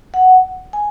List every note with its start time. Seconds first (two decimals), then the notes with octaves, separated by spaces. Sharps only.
0.14 F#5
0.73 G#5